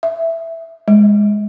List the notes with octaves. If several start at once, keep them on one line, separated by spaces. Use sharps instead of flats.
E5
G#3